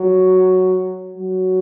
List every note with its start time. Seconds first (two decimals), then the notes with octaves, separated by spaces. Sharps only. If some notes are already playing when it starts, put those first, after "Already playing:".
Already playing: F#3
1.17 F#3